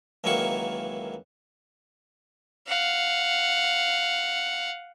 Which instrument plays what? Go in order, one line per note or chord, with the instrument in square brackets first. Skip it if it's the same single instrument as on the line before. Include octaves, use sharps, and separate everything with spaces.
[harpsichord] C#2 D#3 E3 F#3 A#3 C#6
[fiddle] F5 F#5